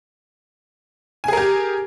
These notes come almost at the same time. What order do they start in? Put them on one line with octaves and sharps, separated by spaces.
G#5 G#4 A#4 G4